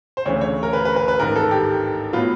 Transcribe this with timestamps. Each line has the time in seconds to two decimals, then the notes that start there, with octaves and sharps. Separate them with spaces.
0.17 C5
0.26 D2 C#3 E3 A3 C4 C#5
0.41 C#5
0.63 A#4
0.73 B4
0.85 B4
0.96 B4
1.08 B4
1.19 A1 G#2 D#3 A#4
1.36 A4
1.51 G4
2.13 A2 F#3 B3 F4